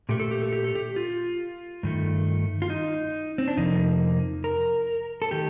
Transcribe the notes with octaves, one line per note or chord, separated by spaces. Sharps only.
A#2 A3 G4
A4
G4
A4
G4
A4
G4
F4
G2 D#3 A3
F4
D#4
C4
D4
F2 C3 F3 A#3 D#4
A#4
A4
D#3 A3 G4